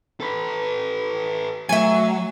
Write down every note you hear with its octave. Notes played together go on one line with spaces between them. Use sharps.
A4 B4
F#3 A3 E5 G#5